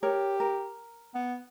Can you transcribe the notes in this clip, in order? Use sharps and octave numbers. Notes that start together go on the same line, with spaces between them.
G4 A#4 C#5
A#4
B3